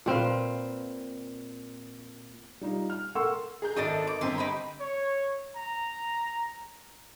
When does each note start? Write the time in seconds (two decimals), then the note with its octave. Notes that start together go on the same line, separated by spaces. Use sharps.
0.06 A#2 C4 B4 F5
2.61 G3 D#4 F4
2.90 F6
3.15 A4 A#4 F#5 C6 C#6 E6
3.62 G#4 A#5 G6
3.76 G#1 A3 D4 D#5 D#6 A6
4.07 D6
4.21 G1 C4 B4 A#5 C6
4.38 D#4 G4 B5
4.80 C#5
5.56 A#5